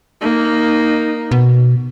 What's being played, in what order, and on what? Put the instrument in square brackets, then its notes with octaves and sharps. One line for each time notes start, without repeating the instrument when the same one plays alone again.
[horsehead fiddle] A#3 D#4
[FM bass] B2